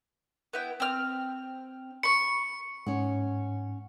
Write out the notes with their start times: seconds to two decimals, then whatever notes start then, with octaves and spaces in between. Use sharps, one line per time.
0.53 B3 E4 G5
0.80 C4 F6
2.03 B5 C#6 C#7
2.87 G#2 C#4 F#5